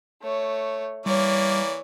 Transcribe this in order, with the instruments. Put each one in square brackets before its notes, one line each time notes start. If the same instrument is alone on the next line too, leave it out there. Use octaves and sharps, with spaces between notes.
[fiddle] A3 C#5
[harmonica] E3 A#3 D5 [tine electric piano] G3 [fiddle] C#5